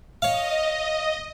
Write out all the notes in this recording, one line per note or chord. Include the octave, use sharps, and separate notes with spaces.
C#5 D#5 F5